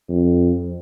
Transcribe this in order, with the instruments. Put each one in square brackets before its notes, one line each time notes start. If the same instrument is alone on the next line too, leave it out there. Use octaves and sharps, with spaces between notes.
[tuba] F2